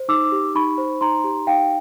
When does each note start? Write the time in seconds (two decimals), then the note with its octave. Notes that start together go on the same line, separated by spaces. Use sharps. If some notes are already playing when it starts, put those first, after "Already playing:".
Already playing: C5
0.09 D#4 D6 E6
0.32 G4
0.55 D#4 B5 C#6
0.78 C5
1.01 D#4 A#5 C6
1.24 G4
1.47 D#4 F5 G5